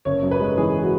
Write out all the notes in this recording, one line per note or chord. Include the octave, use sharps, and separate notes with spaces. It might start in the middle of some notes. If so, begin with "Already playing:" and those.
F#1 C#5
F#2
B4
G#3
E3 G#4
F#4